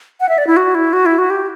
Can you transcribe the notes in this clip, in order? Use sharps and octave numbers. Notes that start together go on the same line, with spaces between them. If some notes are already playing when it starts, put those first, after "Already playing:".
F#5
E5
D5
E4
F#4
E4
F#4
E4
F#4
G4